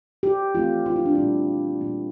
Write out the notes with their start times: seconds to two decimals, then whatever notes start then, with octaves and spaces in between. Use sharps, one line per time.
0.23 G4
0.55 E3 A3 C4 F4
0.86 F4
0.96 E4
1.05 D4
1.15 A#2 G3 A#3 E4
1.81 A#2 G3 A#3